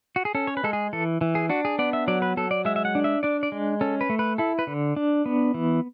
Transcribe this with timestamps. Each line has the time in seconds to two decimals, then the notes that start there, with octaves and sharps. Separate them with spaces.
0.16 F#4
0.25 G#4
0.35 C#4 A4
0.47 C#5
0.57 B4
0.64 G#3 A4
0.73 G#4
0.93 E3 A4
1.21 E3
1.35 G#4
1.49 D4 F#4
1.65 G#4
1.79 B3 D5
1.93 E5
2.08 F#3 D5
2.22 B4
2.37 F#3 A4
2.51 D5
2.65 G#3 E5
2.76 E5
2.85 F#5
2.95 D4
3.04 E5
3.23 D4 D5
3.43 D5
3.52 G#3
3.81 C#4 A4
4.01 B4
4.10 A3
4.19 B4
4.38 E4 A4
4.59 B4
4.67 D3
4.96 D4
5.26 B3
5.54 E3